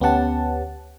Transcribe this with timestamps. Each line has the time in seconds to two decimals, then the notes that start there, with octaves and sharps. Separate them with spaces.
0.01 D2 B3 C#4 G4 F#5 A5